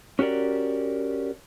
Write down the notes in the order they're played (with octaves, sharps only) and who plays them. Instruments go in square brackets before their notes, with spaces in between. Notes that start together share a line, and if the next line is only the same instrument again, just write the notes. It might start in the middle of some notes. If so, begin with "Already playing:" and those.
[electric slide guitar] C#4 F#4 G4 A#4 D5